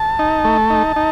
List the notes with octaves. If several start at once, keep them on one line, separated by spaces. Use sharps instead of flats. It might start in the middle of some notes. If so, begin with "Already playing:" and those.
Already playing: A5
D#4
A3
D#4
D#4